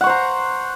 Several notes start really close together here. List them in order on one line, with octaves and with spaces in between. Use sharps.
F#5 C#6 C5 A#5